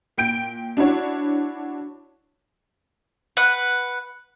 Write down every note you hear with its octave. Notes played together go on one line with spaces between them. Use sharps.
A#2 G5 G6 D7
D4 E4 F#4 C#5
B4 F#5